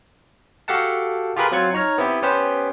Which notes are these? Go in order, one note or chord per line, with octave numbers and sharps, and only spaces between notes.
F#4 G4 A4 F5 F#5 A5
F4 G4 G#4 A#4 B4 B5
F#3 C4 F4 F#6 G#6 C#7
D#4 C#5 A#5 F6
B3 C4 E4 G4
B3 C#4 G4 B4 C5